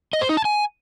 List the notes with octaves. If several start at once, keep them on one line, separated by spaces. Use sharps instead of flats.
D#5
C5
D#4
A5
G#5